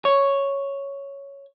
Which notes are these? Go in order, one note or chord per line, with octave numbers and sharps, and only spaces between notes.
C#5